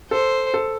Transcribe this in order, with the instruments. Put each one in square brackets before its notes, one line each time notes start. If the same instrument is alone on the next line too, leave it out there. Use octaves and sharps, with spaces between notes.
[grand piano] A4 [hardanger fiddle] C5
[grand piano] A4